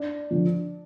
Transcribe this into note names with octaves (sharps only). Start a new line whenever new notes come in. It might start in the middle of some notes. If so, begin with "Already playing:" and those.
Already playing: D4
D3 F3